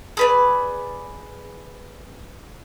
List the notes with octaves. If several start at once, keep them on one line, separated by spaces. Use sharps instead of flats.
G#4 B4 D5